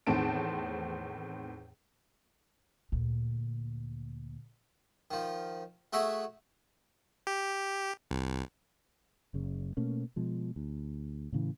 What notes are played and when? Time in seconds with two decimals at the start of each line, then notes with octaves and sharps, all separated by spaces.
0.07 E2 A2 D#3 C4 A5 D7
2.92 D2 A#2
5.11 D#3 F3
5.93 A3 F#4 G#4 E5 F#5 G#5
7.27 G4
8.11 C2
9.34 F#1 C#3
9.77 B2 A3 A#3 C#4
10.16 B2 F3 G#3
10.56 D2
11.32 A2 C#3 E3